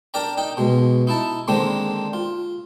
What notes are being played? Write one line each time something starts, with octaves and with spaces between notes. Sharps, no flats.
D4 A#4 D5 G5 A#5
D#4 G5
B2 G#3
D#4 E4 A5
D3 D#3 G#3 A#3 C4 D4
F4